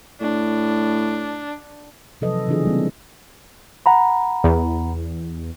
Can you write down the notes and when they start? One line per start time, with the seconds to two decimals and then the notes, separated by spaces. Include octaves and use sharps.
0.21 A2 D4
2.21 C3 F3 F#3 A4 B4 D#5
2.35 E3
2.48 C#3 E3 B3 D4 F4 G#4
2.65 G3 A#3 C4
3.86 F#5 A#5 B5
4.44 E2